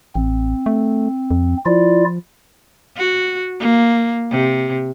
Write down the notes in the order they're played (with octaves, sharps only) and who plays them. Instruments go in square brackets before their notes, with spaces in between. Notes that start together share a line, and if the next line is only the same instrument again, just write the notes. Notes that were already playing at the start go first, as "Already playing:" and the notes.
[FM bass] A1 [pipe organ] C4
[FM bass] A3
F2
[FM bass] F3 [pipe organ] E4 F4 D5
[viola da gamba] F#4
A#3
C3